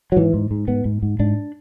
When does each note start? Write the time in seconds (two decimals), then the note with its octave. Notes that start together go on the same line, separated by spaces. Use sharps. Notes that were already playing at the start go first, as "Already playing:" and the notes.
0.12 F#3
0.16 G#2 E3
0.34 G#2
0.51 G#2
0.68 G#2 B3
0.85 G#2
1.03 G#2
1.19 G#2 D4